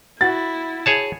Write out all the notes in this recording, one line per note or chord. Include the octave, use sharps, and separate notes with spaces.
E4 F#4 A6
G#4 C#5 A5